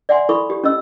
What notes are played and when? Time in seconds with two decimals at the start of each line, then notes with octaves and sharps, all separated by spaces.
0.09 D5 E5 F#5 G#5 C6
0.29 E4 A4 B5 C#6 D#6
0.50 G4
0.64 C#4 D#5 E6